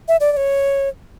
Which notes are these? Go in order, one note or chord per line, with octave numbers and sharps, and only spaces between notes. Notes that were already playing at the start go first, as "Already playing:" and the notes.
E5
D5
D5
C#5